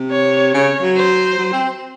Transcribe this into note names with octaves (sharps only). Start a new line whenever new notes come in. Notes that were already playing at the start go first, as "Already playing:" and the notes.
Already playing: C3
C#5
C#3 C#5
F#3
C5
F#3
C4